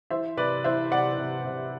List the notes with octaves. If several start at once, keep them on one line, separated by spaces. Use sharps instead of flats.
E3 C5 E5
C3 B4 D5
E3 C5 E5
C3 D5 F#5
C3
C3